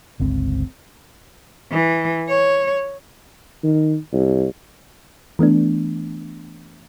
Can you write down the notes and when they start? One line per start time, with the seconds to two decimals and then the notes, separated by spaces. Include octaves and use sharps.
0.20 G1 C#2 C4
1.72 E3
2.29 C#5
3.64 D#3
4.13 C2
5.39 E3 A3 B3 D4